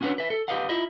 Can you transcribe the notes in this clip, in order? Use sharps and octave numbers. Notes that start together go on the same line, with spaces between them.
C#4 D4 F#4 G#4 B4 C#5
B4 E5
A4
G4 A4 B4 D#5 F5 F#5
E4 F4 D#5 E5